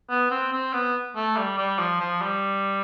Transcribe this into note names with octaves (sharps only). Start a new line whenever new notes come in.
B3
C4
C4
B3
A3
G3
G3
F3
F3
G3